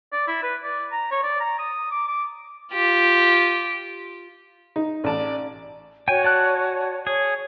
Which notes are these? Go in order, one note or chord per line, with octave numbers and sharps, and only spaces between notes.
D5
E4
B4
D5
A#5
C#5
D5
A#5
D#6
D6
D6
F4 G4
D#4
A1 D5 A5
F#4 C#5 G5 G#5
D5 A5 F#6
G#4 C#5